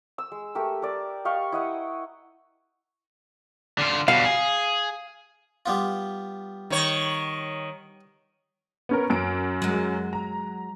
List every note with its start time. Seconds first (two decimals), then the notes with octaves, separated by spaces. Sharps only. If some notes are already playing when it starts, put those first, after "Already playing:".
0.18 E6
0.32 G#3
0.55 A3 G4 A#4
0.82 A#4 D5
1.25 G4 D#5 F5 C#6
1.52 E4 D#5 F#5
3.78 D3 F4
4.08 B2 G3 F5
4.25 G#4
5.66 G3 B3 F4
6.70 D#3 C#5
8.89 B3 C#4 A#4
9.10 F#2 D7
9.62 F#3 G#3
10.13 A#5